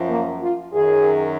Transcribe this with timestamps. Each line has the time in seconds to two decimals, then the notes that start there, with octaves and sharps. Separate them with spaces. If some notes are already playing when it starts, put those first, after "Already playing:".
Already playing: F#2 F3
0.08 A#3
0.41 F4
0.73 F#2 D#3 G#4